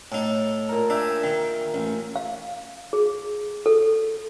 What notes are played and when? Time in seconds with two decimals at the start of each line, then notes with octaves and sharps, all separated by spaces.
0.12 A2 D#4 A4
0.69 A#2 A#4
0.90 D4 E5 G5 G#5
1.23 D#3
1.74 A1
2.16 F5
2.93 G#4
3.66 A4